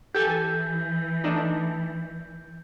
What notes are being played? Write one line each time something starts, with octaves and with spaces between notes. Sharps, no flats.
E3 G4 A4 G#5 G6
A3 D4 D#4